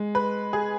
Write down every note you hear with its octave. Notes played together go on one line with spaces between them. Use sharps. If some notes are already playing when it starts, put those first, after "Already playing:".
Already playing: G#3
B4
G#4